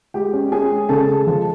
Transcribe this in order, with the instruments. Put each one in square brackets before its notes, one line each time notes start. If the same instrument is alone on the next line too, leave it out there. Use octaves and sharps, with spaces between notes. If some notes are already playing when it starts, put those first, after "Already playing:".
[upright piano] G#3 G4 G5
C#4
C#4 G#4 G#5
G#3
C#3 A4 A5
G#3
F3